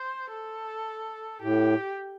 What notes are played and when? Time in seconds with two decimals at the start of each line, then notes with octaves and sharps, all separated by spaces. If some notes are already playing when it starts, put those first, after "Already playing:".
Already playing: C5
0.32 A4
1.42 A2 G4